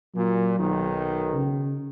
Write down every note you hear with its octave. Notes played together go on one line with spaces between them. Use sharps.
A#2 F#3
B1 D#3
C#3